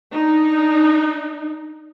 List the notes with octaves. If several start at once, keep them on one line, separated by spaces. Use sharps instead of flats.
D4 D#4